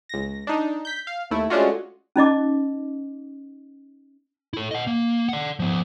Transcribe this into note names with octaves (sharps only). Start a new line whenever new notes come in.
C#2 A#6
D4 D#4
G6 B6
F5
D#2 A3 E4
G#3 A3 C#4 D4 F4 F#4
C#4 D#4 D#5 D6
E4 A4
D#5 F#5
A#3
D5 F#5
F3 B3